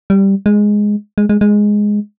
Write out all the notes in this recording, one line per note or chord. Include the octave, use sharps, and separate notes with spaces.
G3
G#3
G#3
G#3
G#3